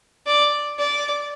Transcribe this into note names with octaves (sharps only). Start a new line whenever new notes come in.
D5
D5